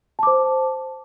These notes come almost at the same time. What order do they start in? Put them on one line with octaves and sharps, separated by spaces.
A5 D6 C5